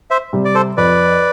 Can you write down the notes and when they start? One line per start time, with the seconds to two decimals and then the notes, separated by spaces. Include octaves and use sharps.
0.10 C5 E5
0.33 C3 G3
0.45 D5
0.55 A4 C5
0.77 F2 B4 D5